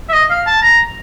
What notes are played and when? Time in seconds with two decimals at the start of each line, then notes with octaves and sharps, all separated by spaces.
0.09 E5
0.13 D#5
0.30 F5
0.47 A5
0.62 A#5